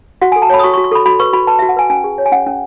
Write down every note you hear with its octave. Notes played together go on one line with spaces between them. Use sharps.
F#4 F#5
A4 G#5
A5
C#5 B5
D#6
F#4 C#6
C#6
F#4
C#6
A4 B5
F#4 B5
B4 C#6
F#4 B5
B4 A5
F#4 E5
F#5
B4 G#5
C#4 G#5
G#4
C#5
G#5
C#4 F#5
C#4